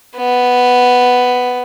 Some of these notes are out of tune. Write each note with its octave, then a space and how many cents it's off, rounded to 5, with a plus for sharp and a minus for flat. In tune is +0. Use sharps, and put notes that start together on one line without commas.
B3 +5